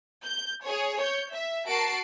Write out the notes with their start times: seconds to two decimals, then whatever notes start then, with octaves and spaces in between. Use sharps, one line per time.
0.25 G6
0.66 G#4 C#5
0.98 C#5 G6
1.34 E5
1.68 F#4 A#4 A5 C7 D7